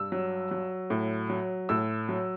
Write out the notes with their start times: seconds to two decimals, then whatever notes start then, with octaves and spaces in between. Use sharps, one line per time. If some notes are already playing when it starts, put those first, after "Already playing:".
Already playing: G2 E6
0.12 F#3
0.51 F#3
0.90 A2
1.30 F#3
1.69 A2 E6
2.09 F#3